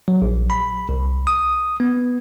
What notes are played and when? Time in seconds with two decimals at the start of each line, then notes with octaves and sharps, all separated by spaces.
0.08 F#3
0.22 A#1
0.50 B5
0.89 C2
1.27 D#6
1.80 B3